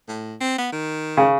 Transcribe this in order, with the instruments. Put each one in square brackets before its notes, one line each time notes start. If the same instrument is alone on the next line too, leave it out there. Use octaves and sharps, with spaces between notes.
[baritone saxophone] A2
C4
B3
D#3
[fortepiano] C#3